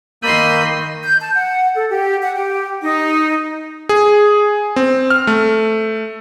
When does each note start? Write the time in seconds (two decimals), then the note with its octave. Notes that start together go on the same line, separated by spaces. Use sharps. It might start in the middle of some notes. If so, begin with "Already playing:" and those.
0.23 D#3 A#3 D#5 B5 C6 E6 G6 D#7
1.04 G6
1.20 A5
1.34 F#5
1.75 A4
1.89 G4
2.22 F#5
2.35 G4
2.82 D#4
3.89 G#4
4.76 C4
5.10 F6
5.27 A3